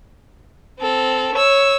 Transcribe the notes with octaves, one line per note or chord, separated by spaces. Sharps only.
C4 A4
C#5 E6